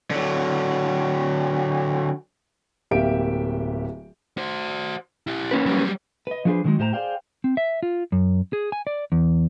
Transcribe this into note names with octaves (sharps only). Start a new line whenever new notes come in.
D3 F#3
D1 A#3 G4 E5 F5 D7
F#4 C5
E4 G4
A#3 C#4 B4
F#3 G3
B4 D#5
F3 A3 D4 G#4 B4 C5
D3 D#3 F#3 G#3 D#4
A2 G4 C5 G#5 A#5
G#4 C5 D5 F5 G5
C4
E5
F4
F#2
G#4
G#5
D5
E2